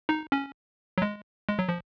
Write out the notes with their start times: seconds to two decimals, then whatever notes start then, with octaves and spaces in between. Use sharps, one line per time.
0.09 D#4
0.32 C#4
0.98 F#3
1.02 G#3
1.49 G#3
1.59 F#3
1.69 F3